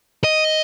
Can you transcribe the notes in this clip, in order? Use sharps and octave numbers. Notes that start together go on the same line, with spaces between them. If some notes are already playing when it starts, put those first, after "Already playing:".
D#5